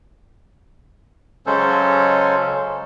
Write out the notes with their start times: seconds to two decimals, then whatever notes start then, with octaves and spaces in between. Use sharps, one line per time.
1.46 C#3 F#3 G#3 C#4 A4 C5